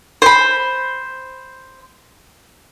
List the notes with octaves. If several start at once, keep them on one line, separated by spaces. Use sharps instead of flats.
C5 B5